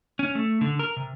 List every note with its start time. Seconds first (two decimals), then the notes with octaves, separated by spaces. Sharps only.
0.19 C#4
0.35 A3
0.61 D3
0.79 A#4
0.96 C3